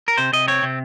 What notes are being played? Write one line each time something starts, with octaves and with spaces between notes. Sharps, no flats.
A#4
C3 C5
C3 D#5
C4 C#5
C3